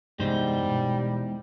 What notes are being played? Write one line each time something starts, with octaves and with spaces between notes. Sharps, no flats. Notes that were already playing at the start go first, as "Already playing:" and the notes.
E2 G2 C3 G3 G#3 D#4 C5
B2